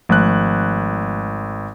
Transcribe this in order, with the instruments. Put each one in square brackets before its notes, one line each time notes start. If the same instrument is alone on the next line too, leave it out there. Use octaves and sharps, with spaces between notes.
[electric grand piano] G#1 F#6 [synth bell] F3 G#3 A3